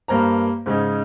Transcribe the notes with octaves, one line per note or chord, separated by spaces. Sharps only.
G2 A#3 C5 A#5
G#2 C#3 C#4 D#4